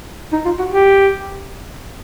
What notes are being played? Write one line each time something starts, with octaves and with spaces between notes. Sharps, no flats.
D#4
F4
F#4
G4